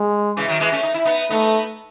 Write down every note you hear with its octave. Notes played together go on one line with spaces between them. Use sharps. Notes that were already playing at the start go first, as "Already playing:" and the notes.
Already playing: G#3
C#3 E3
D#3 F#3
E3 G#3
A3 C#4
D#4
E4
B3 D#4
A3 B3 D#4